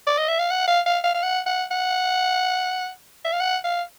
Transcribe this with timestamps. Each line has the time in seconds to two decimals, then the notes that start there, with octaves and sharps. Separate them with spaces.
0.07 D5
0.18 D#5
0.28 E5
0.39 F5
0.51 F#5
0.68 F5
0.86 F5
1.04 F5
1.14 F5
1.23 F#5
1.47 F#5
1.71 F#5
3.25 E5
3.33 F5
3.40 F#5
3.64 F5